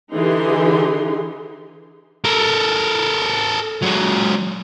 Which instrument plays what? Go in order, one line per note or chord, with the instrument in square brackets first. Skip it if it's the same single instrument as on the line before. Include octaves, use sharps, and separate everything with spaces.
[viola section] D3 E3 D#4 G4 G#4 C6
[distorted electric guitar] A4 A#4
F#3 G#3